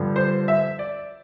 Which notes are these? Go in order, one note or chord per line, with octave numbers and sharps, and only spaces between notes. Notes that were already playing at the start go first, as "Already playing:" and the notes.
Already playing: G2 D3 F3
C5
E5
D5